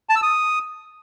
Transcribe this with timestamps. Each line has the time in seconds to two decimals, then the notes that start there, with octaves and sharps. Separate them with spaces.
0.09 A5
0.16 E6
0.22 D#6